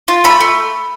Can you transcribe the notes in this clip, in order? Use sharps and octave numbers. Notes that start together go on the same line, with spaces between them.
F4
A3 B5
A3